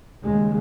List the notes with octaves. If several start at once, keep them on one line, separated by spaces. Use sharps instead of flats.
D#2 C#3 G#3